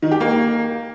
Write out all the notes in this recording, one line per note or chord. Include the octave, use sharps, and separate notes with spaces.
D#3
G4
A#3